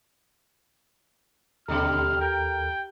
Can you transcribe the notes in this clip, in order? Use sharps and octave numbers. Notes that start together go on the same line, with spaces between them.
D#2 B2 D3 G3 A4 A#5 F6
A#4 G5